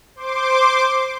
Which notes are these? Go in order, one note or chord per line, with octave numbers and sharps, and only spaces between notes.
C5 C6 D6